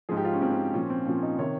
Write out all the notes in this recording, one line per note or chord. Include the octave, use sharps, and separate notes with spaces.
G#2 F3 G#4
G4
F4
C#4
G#2 F3 C4
C4
A#2 F3 C#4
C4
A#2 F3 C#4
D#4
C3 D#3 C#5